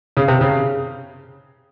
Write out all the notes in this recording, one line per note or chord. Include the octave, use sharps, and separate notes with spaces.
C#3
C3
C#3